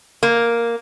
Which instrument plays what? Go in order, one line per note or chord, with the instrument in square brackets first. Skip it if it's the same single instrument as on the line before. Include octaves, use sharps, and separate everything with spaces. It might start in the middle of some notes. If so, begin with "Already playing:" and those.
[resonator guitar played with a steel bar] A#3